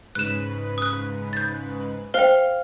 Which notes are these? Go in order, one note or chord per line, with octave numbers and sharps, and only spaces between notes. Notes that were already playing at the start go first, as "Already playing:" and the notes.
G#2 C#3 B4 F#6 E7
D#6 F#6
G6 A6
C5 F5 G5